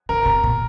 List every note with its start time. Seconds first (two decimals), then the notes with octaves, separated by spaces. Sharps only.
0.09 D3 A#4
0.26 C3
0.44 A#2